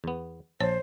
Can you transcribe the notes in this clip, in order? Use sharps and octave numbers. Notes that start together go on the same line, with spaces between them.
E2 B3
A#1 C5 C#5 A5